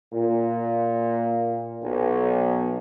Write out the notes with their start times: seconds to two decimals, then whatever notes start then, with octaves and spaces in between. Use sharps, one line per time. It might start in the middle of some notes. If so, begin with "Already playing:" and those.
0.12 A#2
1.81 B1